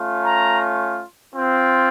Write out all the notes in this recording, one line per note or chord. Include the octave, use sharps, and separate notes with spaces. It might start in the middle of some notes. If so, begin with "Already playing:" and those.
Already playing: A3 C#4 F4
A#5
C4 F4